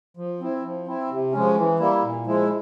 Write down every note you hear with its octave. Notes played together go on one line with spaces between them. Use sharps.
F3
C4 E4
F3
C4 E4
C3
F3 G#3 C#4
E3
G3 A#3 E4
A#2
F3 G#3 E4